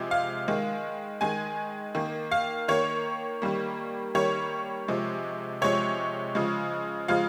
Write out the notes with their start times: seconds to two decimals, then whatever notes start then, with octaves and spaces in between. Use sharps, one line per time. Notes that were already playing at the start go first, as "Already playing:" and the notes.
Already playing: C3 F3 G#3
0.11 F5
0.48 D#3 G#3
1.21 D#3 G#3 G#5
1.95 D#3 A#3
2.31 F5
2.68 D#3 A#3 C#5
3.42 D#3 G3 A#3
4.15 D#3 G3 A#3 C#5
4.88 C3 F3 G#3
5.62 C3 F3 G#3 C#5
6.35 C#3 F3 G#3
7.08 C#3 F3 G#3 F5